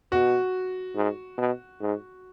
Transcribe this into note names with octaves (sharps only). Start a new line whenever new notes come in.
B2 F#4
G#2
B2
G#2